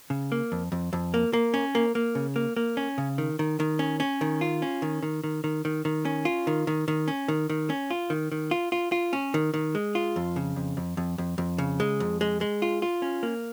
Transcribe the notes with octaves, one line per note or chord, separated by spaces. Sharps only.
C#3
A#3
F2
F2
F2
A#3
A#3
C#4
A#3
A#3
C#3
A#3
A#3
C#4
C#3
D#3
D#3
D#3
C#4
C#4
D#3
F4
C#4
D#3
D#3
D#3
D#3
D#3
D#3
C#4
F4
D#3
D#3
D#3
C#4
D#3
D#3
C#4
F4
D#3
D#3
F4
F4
F4
C#4
D#3
D#3
G#3
F4
F2
C#3
F2
F2
F2
F2
F2
C#3
G#3
F2
G#3
G#3
F4
F4
C#4
A#3